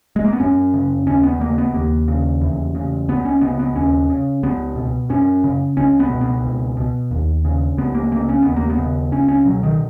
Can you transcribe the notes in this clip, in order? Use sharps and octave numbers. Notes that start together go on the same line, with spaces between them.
G#3
A#3
B3
F#2 C#4
C#3
D#2 C#4
B3
C#3 A#3
B3
D#2 A#3
C#3
E2
C#3
C#2 B3
C#4
C#3 B3
B3
D#2 C#4
C#3
C#2 B3
B2
F#2 C#4
C#3
C#2 C#4
B3
B2
B3
C#2
B2
D#2
C#3
C#2 B3
A#3
C#3 A#3
C#4
D#2 B3
A#3
B3
C#3
C#2 C#4
C#4
B2 F#3
D#3